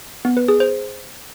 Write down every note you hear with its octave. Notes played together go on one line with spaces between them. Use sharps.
B3
B4
G#4
C5